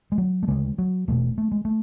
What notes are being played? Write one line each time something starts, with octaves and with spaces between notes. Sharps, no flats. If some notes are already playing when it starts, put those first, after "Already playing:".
G#3
F#3
A3
D2 C#3 G#3
F#3
E1 E2 B2 A3
A3
G#3
A3